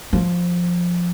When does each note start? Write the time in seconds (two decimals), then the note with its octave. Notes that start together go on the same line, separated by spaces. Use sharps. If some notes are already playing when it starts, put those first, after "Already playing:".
0.13 F3